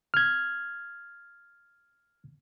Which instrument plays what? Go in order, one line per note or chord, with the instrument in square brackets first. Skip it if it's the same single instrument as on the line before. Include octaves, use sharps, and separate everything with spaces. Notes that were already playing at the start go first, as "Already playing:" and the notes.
[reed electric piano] F6 G#6